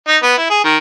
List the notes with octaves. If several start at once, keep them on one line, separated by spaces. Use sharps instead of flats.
D#4
B3
E4
G#4
D#3